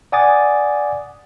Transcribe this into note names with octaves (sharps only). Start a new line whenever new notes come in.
D5 F#5 G#5 D6 D#6 A6